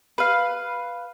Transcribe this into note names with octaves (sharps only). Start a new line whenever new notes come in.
B4 F5